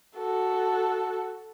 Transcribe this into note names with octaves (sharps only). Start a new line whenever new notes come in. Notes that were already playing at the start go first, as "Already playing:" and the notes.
F#4 A4